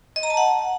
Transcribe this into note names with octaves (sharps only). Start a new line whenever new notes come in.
D#5
A#5
A5
F#5